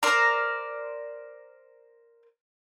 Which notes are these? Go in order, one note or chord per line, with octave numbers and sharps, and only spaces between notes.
A#4 C5 D5 A#5